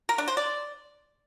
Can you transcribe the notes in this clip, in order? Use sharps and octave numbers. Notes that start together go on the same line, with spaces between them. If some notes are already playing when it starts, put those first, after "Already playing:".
A#4
D4
C5
D5